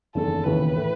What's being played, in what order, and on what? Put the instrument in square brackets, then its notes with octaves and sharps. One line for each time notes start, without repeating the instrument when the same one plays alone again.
[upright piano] F#1 E2 D#3 [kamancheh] A4
[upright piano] E1 D#2 C#3 E3 [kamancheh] B4
[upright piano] A2 E3